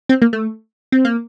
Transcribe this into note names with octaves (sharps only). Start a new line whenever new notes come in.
C4
A#3
A3
C4
A#3